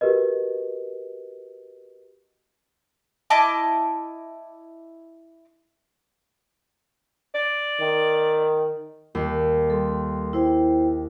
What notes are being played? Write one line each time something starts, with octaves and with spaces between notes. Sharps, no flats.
F#4 G4 A#4 B4 D#5
E4 D#5 A5 D6
D5
D#3
D#2
G3 A4 C6
E4 C5 G5